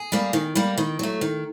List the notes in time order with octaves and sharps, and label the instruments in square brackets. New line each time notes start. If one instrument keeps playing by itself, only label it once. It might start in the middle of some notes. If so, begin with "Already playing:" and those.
Already playing: [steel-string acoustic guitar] G#4
G3 A#3
D#3
G3 A#3
D#3
F#3 A3
D#3